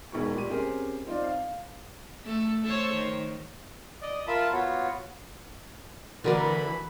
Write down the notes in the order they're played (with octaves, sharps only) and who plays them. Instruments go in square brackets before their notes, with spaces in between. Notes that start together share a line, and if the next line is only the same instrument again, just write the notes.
[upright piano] E1 B1 D#3 G#3 B3 C#6
A#2 G3 G4 D#7
C4 C#4 G4 G#4 A#4
C4 D#4 F4 D5
F5
[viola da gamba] A3 A4
A4 C5 C#5
D#3
[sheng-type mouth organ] D5 D#5
F4 A#4 E5 A5 B5
B3 F4 F#4 C#5
[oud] D3 A#4 D5 [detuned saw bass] E3 [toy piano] F#4 F#5 [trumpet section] B4 B5